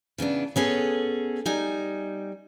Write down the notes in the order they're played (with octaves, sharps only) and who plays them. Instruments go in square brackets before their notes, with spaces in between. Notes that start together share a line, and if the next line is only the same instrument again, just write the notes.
[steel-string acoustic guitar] C#3 E3 B3 D4
B3 C#4 G#4 A4
G3 D#4 G#5